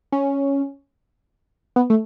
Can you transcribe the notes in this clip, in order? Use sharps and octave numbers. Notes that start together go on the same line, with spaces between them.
C#4
B3
A3